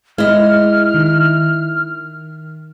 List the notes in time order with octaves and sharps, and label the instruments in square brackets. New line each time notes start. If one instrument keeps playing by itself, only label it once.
[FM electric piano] G#3 [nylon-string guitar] E4 D#5 [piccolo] F6
[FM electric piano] D#3